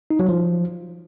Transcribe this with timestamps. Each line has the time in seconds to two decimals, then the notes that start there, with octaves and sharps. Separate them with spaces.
0.10 D#4
0.20 F#3
0.29 F3